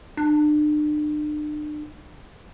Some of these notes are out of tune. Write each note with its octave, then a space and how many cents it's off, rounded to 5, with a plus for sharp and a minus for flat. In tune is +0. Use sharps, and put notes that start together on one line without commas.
D4 +40